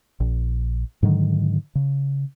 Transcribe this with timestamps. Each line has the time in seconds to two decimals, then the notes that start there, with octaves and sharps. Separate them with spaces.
0.20 A#1
1.03 G#2 D3 D#3 F#3
1.75 C#3